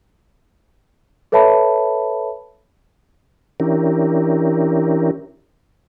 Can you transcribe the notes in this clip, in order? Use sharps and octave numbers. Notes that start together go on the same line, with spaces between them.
A4 B4 C#5 E5 A5 B5
E3 C#4 D4 E4 G4 A#4